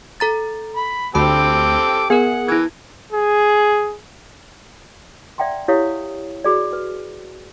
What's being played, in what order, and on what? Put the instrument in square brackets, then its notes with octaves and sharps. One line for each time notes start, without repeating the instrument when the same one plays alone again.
[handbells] A4 A#5 A6
[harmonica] B5
[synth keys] D2 [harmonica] C4 G4 A4 [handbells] B5 [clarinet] D6
[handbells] B3 A#4 [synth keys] G#4 [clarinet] F#5
[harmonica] E3 [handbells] E4 G#6
[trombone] G#4
[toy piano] D5 E5 F#5 G5 A#5 C6
E4 G4 C#5 F5 D#6
F#4 G#4 D5
B4